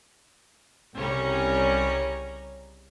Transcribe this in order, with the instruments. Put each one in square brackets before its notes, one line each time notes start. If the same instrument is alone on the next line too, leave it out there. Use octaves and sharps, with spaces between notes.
[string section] C2 C#3 G3 C#4 C#5 A#5